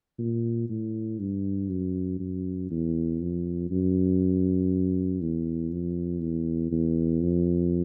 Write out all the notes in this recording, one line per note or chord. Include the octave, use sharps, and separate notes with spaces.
A#2
A2
G2
F#2
F#2
E2
F2
F#2
E2
F2
E2
E2
F2